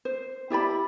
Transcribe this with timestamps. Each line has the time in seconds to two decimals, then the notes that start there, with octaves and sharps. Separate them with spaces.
0.05 C5
0.50 E4 G4 D5 B5